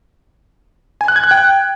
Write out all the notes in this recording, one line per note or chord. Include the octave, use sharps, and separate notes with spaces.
G#5
F#6
G#6
F#6
G5